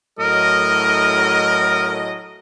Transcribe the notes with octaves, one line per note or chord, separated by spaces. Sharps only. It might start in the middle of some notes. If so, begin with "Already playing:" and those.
A2 F#3 A#4 D#5